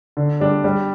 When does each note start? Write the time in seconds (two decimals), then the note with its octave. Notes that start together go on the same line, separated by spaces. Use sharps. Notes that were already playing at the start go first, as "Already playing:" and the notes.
0.17 D3
0.40 G3 D4
0.64 G3